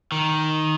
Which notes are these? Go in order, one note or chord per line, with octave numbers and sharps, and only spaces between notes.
D#3